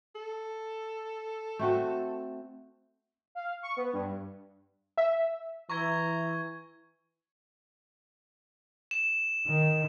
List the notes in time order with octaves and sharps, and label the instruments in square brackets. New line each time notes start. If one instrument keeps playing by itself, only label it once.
[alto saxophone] A4
[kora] A3 C4 F#4
[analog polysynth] F5
C#6
B3
G2
[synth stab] E5
[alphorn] E3 [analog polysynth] E4 [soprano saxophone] A#5 [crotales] C#6 G#6 G7
[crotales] E7
[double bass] D#3